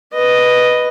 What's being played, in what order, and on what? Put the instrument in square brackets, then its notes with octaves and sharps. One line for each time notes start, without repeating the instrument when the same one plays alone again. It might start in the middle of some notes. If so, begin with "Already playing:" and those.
[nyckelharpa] B4 D#5